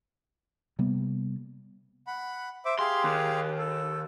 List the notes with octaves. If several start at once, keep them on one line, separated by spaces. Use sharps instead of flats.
C3 G3 A#3 B3
F#5 B5
C5 E5 D6
G4 G#4 F5 C6
D#2
A4